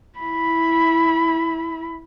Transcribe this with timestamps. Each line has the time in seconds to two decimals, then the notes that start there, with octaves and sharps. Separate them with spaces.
0.19 E4 B5